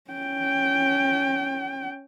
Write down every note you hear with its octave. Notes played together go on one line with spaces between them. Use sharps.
C#4 G5